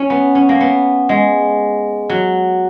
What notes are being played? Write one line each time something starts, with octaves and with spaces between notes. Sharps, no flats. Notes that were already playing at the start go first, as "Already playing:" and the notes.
Already playing: C#4
B3
C#4
A#3
B3
G#3
F#3